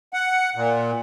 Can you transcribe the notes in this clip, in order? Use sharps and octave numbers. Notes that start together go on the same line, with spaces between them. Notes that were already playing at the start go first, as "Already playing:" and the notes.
F#5
A#2